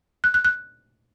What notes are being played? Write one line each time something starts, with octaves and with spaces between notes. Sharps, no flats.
F#6
F#6
F#6